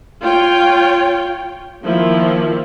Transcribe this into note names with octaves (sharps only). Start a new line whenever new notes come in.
F4 C#5 G5
D#3 F3 A#3 E4